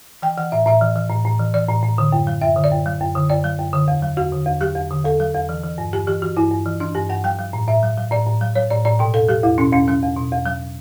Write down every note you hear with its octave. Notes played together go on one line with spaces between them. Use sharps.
E3 G5
E3 F#5
A2 E5
A2 E5
E3
E3
A2
A2
E3
E3 D5
A2
A2
D3
F#2
F#3
F#2 E5
D3
D5
F#2
F#3
F#2
D3
F#2 D5
F#3
F#2
D3
E2
F#3
E2 F#4
D3
E2
F#3 G4
E2
D3
E2 A4
F#3
E2
E3
E3
G2
G2 G4
E3 G4
E3 F#4
G2 E4
G2
E3
E3 D4
G2 G4
G2 F#5
F#3 G5
F#3
A2
A2 E5
F#3
F#3
A2 D5
A2
F#3
F#3 C#5
A2 D5
A2 D5
B2 G5
E2 A4
F#3 G4
E2 E4
B2 C#4
E2 C#4
F#3 C#4
E2
B2
E2
F#3